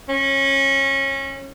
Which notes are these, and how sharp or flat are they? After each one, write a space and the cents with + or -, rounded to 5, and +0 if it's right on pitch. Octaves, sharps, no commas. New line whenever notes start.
C#4 -25